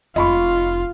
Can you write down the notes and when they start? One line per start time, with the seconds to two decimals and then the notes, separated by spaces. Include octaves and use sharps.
0.16 F1 F4 D#5 B5 C#6